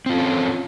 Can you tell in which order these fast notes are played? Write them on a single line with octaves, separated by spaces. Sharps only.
C4 F4 A4 C#4